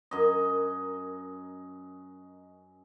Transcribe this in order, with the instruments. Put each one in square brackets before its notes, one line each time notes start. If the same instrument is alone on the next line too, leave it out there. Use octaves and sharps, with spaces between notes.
[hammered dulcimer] F#2 D#5